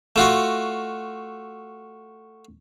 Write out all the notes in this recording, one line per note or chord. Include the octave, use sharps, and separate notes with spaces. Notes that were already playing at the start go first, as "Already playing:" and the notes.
A3 F4 F#4